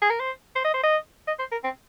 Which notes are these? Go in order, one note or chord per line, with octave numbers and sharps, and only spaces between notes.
G#4
A#4
C5
C5
D#5
C5
D#5
D#5
C5
A#4
C4